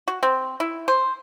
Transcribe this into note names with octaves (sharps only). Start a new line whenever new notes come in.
F#4
C4
E4
C5